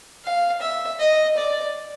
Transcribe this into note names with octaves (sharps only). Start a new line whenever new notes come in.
F5
E5
D#5
D5